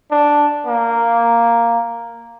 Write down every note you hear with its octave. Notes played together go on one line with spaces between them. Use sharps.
D4
A#3